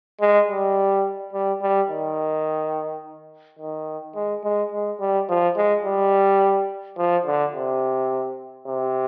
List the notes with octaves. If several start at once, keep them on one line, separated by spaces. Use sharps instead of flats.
G#3
G3
G3
G3
D#3
D#3
G#3
G#3
G#3
G3
F3
G#3
G3
F3
D3
C3
C3